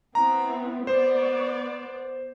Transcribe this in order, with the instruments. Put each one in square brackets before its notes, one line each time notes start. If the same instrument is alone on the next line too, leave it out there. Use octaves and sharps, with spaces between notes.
[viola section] B3 C4 E4 [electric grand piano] A#5
[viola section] B3 D5 [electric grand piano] C5